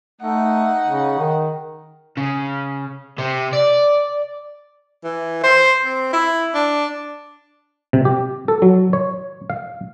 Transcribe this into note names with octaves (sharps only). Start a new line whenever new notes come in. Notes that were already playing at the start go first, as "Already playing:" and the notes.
A3 D#4 F#5
C#3
D#3
C#3
C3
D5
E3
C5
C4
E4
D4
C3
G4
A4
F#3
C#5
F5